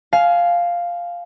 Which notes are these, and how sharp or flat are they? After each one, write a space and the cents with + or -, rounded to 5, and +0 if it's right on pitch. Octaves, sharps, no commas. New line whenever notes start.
F5 +0 G#5 +30